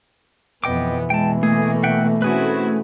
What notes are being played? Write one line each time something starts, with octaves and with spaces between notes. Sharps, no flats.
F2 B2 E3 B3 D#5 G5 D6
G#3 G5 A5
A3 A#3 G#4
E5 F#5 G5
C4 C#4 E4 F#4 G#4 B4